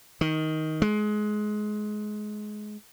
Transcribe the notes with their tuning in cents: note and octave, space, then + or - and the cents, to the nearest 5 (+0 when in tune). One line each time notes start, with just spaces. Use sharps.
D#3 +10
G#3 +20